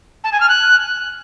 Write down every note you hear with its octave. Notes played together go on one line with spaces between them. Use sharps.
A5
G#5
F6
F#6